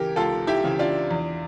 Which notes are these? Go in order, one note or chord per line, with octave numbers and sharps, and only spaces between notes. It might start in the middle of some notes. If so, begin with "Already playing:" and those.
Already playing: C#3 E3 G4 A#4
C#2 F4 A4
E4 G4
C#3 E3
D4 F4
E2